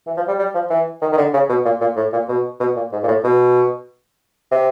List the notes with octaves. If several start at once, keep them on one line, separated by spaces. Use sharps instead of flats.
E3
F3
G3
G3
F3
E3
D#3
D#3
D3
C#3
B2
A#2
A#2
A2
A#2
B2
B2
A#2
G#2
A#2
A2
B2
C3